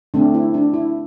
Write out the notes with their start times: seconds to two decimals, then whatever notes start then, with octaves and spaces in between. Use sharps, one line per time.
0.14 D3 A3 C4 D4
0.34 E4
0.54 D4
0.74 E4